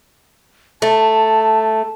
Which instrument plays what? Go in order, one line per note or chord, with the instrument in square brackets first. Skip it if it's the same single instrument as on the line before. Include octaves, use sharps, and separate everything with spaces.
[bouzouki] A3 [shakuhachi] A5